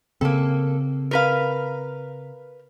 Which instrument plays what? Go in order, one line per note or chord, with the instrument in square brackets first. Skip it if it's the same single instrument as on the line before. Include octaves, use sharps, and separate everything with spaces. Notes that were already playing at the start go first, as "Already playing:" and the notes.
[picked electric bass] C#3 C4 [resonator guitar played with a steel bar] A#3 A4
[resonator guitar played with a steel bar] A#4 B4 F5